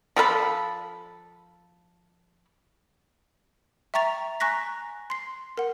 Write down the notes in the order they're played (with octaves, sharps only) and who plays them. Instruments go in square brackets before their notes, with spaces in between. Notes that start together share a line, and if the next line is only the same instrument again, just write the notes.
[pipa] F3 A4 A#4 B5
[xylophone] E5 G5 A#5 C#6 A6 F7
G#5 A#5 C#6 F#6 A#6 B6
C6 C7
A#4 F#5